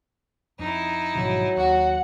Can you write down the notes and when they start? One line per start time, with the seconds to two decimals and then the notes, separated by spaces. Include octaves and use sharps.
0.59 F2 D#4 E4
1.15 G#1 B2 F3 F#3
1.56 D#2 F#4 F#5